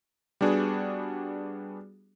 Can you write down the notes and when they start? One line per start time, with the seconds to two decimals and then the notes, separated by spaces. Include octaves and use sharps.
0.41 G3 B3 D4 F#4 G#4